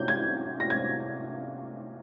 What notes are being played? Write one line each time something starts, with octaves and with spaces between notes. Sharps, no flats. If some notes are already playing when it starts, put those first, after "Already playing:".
Already playing: C3 C#4 G6
G#6
A#6
G#6